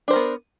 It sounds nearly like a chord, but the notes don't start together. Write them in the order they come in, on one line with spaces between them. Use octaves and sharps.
D4 C5 A#4 B3